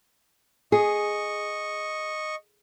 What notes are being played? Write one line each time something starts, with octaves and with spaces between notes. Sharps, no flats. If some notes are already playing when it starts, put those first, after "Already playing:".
G#4 D#5 C#6